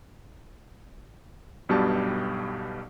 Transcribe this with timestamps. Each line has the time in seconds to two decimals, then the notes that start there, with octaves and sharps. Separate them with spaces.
1.69 B1 G2 B2 G3 G4 A5